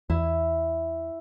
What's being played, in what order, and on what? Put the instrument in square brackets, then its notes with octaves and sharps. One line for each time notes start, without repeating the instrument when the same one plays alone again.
[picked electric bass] E2 [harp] E4